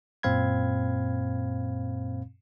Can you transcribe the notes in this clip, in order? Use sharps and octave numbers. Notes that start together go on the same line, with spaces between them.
F#2 A#2 C4 F5 B5 G#6